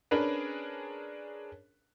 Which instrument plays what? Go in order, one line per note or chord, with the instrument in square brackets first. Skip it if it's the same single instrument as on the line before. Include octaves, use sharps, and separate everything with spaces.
[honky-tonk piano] C#4 D4 G#4 A#4 B4